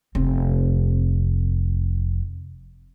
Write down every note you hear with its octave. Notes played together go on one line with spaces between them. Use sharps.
F1 C4